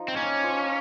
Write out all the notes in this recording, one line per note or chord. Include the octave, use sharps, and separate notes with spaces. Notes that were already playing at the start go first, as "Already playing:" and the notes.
Already playing: F3 D#4
C4
A#3 C#4
F3